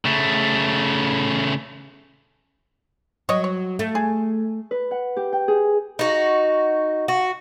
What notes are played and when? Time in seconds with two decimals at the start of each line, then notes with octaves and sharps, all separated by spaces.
0.05 C#3 A3
3.29 F#3 C#5 D#5
3.44 C#5
3.79 A3
3.95 G#4
4.71 B4
4.91 F#5
5.16 G4
5.32 G5
5.48 G#4
5.99 D#4 F#4
7.08 F#4